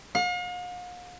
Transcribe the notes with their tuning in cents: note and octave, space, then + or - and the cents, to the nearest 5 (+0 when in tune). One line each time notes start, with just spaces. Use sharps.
F5 +45